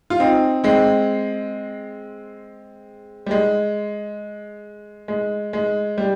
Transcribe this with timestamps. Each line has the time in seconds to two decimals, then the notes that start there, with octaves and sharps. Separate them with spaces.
0.10 F4
0.20 C4 D#4
0.64 G#3 C4
3.26 G3
3.31 G#3
5.08 G#3
5.53 G#3
5.98 G3